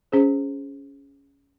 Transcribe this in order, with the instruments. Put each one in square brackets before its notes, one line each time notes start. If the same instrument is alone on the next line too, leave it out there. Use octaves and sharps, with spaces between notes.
[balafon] C#4 G#4 C5